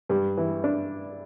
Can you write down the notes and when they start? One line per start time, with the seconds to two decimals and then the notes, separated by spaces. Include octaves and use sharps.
0.09 G2
0.37 E3
0.64 D4